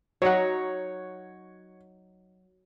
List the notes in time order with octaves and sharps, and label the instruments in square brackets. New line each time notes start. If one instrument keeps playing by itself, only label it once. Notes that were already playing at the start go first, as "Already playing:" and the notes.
[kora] F#3 D#4 [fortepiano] C#5 F#5